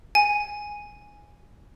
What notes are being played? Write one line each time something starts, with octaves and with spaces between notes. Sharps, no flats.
G#5